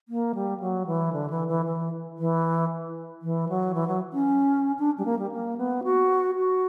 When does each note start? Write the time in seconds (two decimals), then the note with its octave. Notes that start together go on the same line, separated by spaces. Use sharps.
0.09 A#3
0.35 G3
0.60 F#3
0.87 E3
1.13 D3
1.30 E3
1.48 E3
1.65 E3
2.18 E3
3.22 E3
3.49 F#3
3.74 E3
3.88 F#3
4.13 C#4
4.79 D4
4.98 G3
5.05 A#3
5.19 G3
5.32 A#3
5.58 B3
5.84 F#4
6.36 F#4